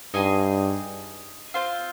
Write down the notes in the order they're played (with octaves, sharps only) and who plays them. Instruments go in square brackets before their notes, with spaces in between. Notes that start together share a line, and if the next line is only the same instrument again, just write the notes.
[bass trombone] G2 [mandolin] D#4 G#4 D#5 G#5
[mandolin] C4 F4 C5 F5